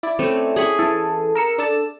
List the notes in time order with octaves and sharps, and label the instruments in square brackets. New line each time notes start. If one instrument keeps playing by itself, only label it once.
[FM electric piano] E4 D5
[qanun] A3 C4 C#4
G#4 B5 C#6
[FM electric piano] E3 A4
A#4 E6 C#7
D4 A4 A5